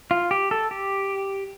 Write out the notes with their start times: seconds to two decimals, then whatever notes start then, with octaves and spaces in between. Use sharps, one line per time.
0.11 F4
0.31 G4
0.51 A4
0.71 G4